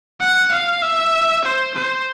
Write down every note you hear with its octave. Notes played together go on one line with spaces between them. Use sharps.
F#5
F5
E5
C5
C5